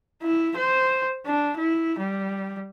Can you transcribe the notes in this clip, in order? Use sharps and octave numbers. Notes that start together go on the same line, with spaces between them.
E4
C5
D4
E4
G3